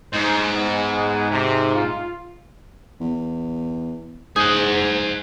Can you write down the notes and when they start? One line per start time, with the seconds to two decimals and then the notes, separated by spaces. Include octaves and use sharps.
0.13 G#2 D#4 C5
0.52 G#3 B3
1.31 C3
1.75 F4
3.00 E2
4.36 G#2 G#4 F#5 D#6 G6